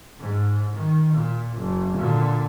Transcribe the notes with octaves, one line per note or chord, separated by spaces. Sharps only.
G#2
D#3
A#2
F#1
A#2 D3